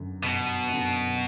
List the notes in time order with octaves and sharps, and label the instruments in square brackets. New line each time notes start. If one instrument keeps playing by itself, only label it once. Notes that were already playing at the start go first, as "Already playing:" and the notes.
Already playing: [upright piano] G1 F#2 D3
[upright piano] G1 [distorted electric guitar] B2
[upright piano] F#2 D3